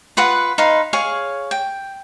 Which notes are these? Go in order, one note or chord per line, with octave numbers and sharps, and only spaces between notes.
F4 B4 F#5 D#6
D#4 B4 F5 C6
G#4 C#5 F5 G#5
G5